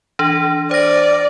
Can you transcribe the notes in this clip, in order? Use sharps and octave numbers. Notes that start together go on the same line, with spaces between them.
E3 D4
C5 D5 A#6